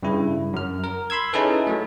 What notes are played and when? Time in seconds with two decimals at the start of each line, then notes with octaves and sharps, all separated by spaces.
0.03 G2 C#3 E4
0.53 F#2 F6
0.84 A#4
1.10 B5 C6 E6 G#6
1.33 C#4 D#4 E4 G#4 A4 B4
1.67 F#3 A3